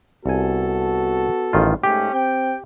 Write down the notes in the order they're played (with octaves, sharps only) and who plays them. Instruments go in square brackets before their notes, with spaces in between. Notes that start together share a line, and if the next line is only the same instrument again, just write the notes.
[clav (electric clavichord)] C2 G#5 [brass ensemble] B3 F#4 A4
[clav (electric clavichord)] A1 D#3 F4
[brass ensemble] G#2 A3 C#4 [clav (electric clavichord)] G4
[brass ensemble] C4 G5